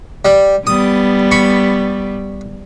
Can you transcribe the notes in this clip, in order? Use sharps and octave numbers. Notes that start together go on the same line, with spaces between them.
G3
G3 B3 D#6
B5 C#6